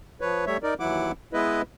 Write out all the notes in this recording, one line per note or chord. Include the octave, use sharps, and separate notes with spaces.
F3 B4 C#5
G3 A3 C#5 E5
D#4 A#4 D5
D#2 E3 F#3 E4 F#5 D6
G#3 B3 E4 B4 D#5